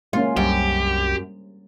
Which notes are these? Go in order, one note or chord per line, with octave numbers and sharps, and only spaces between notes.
G#3 A#3 C#4 F4
C2 F#2 G3 G4 C5